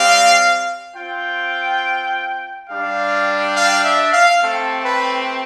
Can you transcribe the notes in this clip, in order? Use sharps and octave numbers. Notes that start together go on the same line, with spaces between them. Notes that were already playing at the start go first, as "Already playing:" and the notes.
Already playing: G3 C4 G4 F5
C4 F4 G5
G3 D4 G4 F5
F5
E5
F5
A3 C4 G4 A4
B4